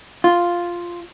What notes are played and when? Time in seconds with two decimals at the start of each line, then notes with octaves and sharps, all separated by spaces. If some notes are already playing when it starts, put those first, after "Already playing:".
0.24 F4